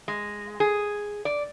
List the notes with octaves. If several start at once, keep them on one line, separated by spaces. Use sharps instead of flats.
G#3
G#4
D5